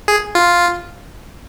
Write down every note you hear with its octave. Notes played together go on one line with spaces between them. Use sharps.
G#4
F4